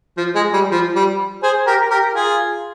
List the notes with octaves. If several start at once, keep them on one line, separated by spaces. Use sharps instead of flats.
F3
G#3
G3
F3
G3
G#4 C5
G4 A#4
G4 A#4
F4 G#4